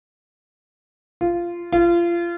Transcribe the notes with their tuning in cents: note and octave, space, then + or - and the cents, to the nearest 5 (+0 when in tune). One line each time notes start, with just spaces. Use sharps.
F4 -15
F4 -30